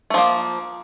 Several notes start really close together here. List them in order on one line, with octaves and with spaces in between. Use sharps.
A3 F3 A#3